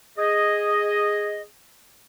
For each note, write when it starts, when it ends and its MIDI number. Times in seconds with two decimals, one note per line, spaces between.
0.18 1.43 68
0.18 1.43 75